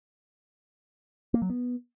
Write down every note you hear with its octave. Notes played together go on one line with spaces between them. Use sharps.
A#3
F#3
B3